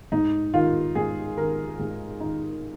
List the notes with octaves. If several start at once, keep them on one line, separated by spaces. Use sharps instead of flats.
G#2 D#4
D#3 F4
G#2 G#4
D#3 A#4
G#2 G#4
D#3 D#4